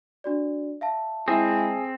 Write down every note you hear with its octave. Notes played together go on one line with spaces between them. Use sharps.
D4 F#4 D5
E5 F5 A5
G#3 C4 E4 G#4